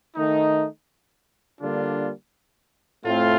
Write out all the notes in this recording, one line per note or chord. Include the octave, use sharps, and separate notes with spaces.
D#3 A3 D#4
D3 G3 A#3 D4 F4
A2 A3 C4 F4